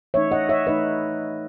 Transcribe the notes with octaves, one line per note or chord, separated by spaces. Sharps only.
E3 A3 D#4 C#5 E5
D#5 F#5
C#5 E5
E3 A3 D#4 B4 D#5